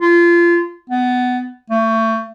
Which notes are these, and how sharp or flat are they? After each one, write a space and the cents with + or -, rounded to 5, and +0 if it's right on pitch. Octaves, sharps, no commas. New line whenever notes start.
F4 -25
B3 +15
A3 +30